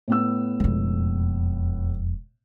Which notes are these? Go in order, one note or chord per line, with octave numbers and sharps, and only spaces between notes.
A2 B3 E6
E1 F2